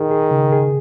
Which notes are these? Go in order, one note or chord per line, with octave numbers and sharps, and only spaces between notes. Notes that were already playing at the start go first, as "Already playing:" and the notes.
Already playing: D#3 G#4
G#4
C#3
G#4